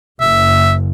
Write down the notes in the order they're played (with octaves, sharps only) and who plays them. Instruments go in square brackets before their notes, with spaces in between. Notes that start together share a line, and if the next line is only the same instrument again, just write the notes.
[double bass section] F#1 [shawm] E5